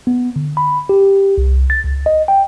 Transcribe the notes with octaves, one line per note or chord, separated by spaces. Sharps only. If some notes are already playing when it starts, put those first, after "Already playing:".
B3
D3
B5
G4
C2
A6
C#2
D#5
G5